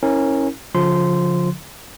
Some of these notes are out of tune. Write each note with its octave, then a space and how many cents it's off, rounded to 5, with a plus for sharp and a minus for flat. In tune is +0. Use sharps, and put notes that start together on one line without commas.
C#4 -20 E4 -35 A#4 +0
D3 -40 F3 +20 C6 -15